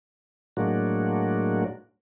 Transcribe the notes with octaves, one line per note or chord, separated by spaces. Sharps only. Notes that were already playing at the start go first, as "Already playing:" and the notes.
A2 F#3 G#3 A#3 D4 F#4